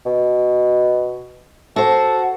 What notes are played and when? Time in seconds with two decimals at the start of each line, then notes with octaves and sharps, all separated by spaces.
0.05 B2
1.76 F#4 A4 C5